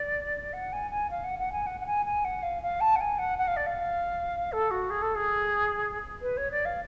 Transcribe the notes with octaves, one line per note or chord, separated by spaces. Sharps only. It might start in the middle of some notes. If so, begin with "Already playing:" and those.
Already playing: D5
F#5
G#5
G#5
F5
F#5
F#5
G#5
F#5
F#5
G#5
G#5
F#5
F5
F5
A5
F#5
G#5
F#5
F#5
F5
D5
F5
A4
F#4
G#4
A4
G#4
B4
C#5
D5
F5